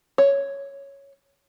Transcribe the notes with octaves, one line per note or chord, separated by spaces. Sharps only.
C#5